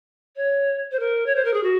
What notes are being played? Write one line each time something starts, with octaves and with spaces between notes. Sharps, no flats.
C#5
C5
A#4
C#5
C5
A#4
G#4
F#4